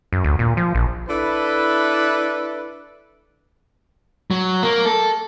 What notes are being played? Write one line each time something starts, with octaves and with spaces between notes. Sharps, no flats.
F#2
D2
A#2
F3
A#1
D4 E4 A4 B4
F#3
A#3
A4